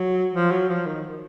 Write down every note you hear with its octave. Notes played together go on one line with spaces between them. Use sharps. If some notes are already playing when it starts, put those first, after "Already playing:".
Already playing: F#3
F3
F#3
F3
D#3